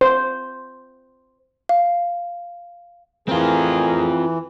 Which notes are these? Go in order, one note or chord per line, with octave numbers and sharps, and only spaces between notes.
C5
F5
A2 E3 C4 F4 G#4 A#4